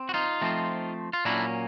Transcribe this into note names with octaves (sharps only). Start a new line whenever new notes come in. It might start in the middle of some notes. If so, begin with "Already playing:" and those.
Already playing: C4
F#4
D#4 F4
F3 A3 C4
F4
A#2 F#3 A#3 C#4 D4 E4